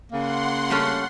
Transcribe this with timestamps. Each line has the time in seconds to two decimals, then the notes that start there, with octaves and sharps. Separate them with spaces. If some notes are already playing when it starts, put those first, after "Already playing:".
0.12 C#3 A#3 F#5 C6
0.70 G3 A3 C#4